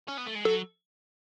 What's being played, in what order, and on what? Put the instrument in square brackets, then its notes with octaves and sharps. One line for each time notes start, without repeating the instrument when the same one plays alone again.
[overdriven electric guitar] C#4
B3
A3
G#3
[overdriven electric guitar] F#3 [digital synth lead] A4